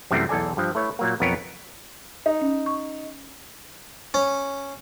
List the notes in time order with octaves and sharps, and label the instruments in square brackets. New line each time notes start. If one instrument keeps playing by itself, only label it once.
[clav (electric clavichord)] F#2 C3 E3 G3 A3 C4
B1 E2 A4 D5 G#5
G2 F3
A3 E4 B4 C#5
A#2 F#3 A#3
B1 F2 B3 A#4 B4 C#5
[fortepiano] D#4
[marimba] C#4
C#6
[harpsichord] C#4